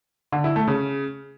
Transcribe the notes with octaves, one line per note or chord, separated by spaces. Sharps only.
D3
E4
A3
C#3